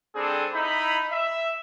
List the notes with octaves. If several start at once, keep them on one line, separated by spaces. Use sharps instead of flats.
G3 C4 D4 G#4 A4
D#4 E4 B5
E5